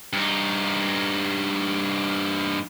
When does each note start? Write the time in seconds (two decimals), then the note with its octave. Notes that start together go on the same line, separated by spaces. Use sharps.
0.13 G2 D#4